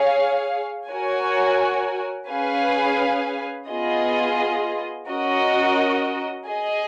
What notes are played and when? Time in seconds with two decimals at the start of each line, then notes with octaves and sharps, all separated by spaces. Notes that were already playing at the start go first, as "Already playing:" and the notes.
Already playing: G#4 C#5 F5
0.89 F#4 A#4 C#5 G#5
2.29 C#4 G#4 B4 F5 G#5
3.68 B3 F4 G#4 D#5
5.09 C#4 F#4 A#4 D#5
6.48 G#4 D#5 G#5